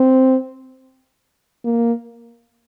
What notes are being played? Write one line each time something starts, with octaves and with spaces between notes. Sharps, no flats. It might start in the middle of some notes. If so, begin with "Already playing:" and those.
Already playing: C4
A#3